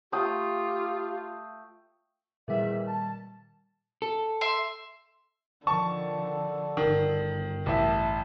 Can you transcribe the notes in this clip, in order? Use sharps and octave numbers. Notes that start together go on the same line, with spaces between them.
A3 F4 G4 G5 D#6
E2 A#2 D#3 G3 E5
A5
A4
E5 C6
D3 D#3 F3 A5 C#6
G1 D#3
A1 E5 A5